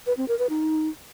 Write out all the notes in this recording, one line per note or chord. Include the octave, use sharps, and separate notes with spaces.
B4
C4
A#4
B4
D#4